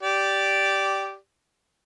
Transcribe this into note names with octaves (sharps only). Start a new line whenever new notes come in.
G4 D5